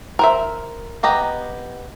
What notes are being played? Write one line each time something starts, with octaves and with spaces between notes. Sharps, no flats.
A#4 C5 E5
B3 G4 D#5 A#5